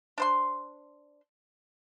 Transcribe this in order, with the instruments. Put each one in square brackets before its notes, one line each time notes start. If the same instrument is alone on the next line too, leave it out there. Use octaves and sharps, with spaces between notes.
[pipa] D4 C5 C6